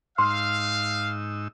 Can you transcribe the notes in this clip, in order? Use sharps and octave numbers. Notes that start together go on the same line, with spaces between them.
G#2 D#4 F5 C6 E6